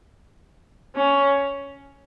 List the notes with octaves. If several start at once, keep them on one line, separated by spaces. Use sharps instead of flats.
C#4